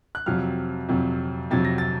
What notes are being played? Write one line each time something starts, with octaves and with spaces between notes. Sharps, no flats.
F#6
F2 C3 F#3 F6
F2 C3 F#3
F2 C3 F#3 A6
A#6
A6